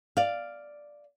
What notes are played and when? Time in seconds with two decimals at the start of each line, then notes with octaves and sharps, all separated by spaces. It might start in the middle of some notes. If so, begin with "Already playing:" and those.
0.17 D5 F5